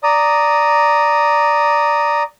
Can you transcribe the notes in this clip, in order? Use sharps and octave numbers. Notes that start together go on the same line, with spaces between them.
D5 A#5 D#6